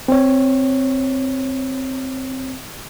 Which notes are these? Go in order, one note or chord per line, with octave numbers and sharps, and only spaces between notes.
C4 C#5